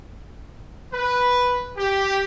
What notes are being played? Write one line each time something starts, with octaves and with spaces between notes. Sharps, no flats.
B4
G4